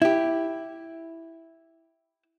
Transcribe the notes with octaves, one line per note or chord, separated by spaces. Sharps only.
E4 G4